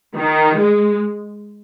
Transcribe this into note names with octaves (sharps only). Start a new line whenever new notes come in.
D#3
G#3